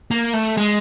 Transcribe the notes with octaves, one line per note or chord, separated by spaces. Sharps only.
A#3
A3
G#3